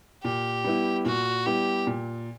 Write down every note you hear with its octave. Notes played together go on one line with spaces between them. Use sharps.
A#2 G4
G3 B3 E4
A#2 F#4
G3 B3 E4 G4
A#2